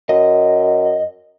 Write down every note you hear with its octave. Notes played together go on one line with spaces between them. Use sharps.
F#2 D#5